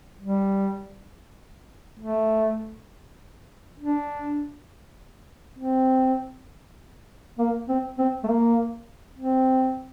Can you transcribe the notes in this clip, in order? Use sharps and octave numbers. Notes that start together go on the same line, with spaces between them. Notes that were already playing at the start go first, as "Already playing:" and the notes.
G3
A3
D4
C4
A#3
C4
C4
A3
A#3
C4